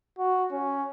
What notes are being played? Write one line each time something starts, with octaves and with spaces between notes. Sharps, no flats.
F#4
C#4